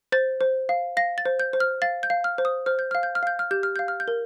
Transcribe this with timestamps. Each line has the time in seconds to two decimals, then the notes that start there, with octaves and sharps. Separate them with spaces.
0.12 C5 A6
0.41 C5
0.69 F5
0.97 F5 A#6
1.18 A6
1.26 C5
1.40 G6
1.53 C5
1.60 F6
1.82 F5 A6
2.03 G6
2.10 F5
2.24 F6
2.38 C5
2.45 D#6
2.66 C5 F6
2.79 G6
2.91 F5 F6
3.03 G6
3.15 F6
3.23 F5 G6
3.39 F6
3.51 G4 G6
3.63 F6
3.76 F5 G6
3.88 F6
4.00 G6
4.08 A#4